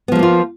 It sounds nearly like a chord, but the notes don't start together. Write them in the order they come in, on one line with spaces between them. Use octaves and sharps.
B3 F3 G#3 A#3 F4